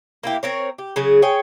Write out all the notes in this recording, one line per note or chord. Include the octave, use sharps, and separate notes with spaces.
A#3 E4 G4
C4 A#4 C#5
G4
C#3 F#3 C#4 G#4
G#4 C#5 G5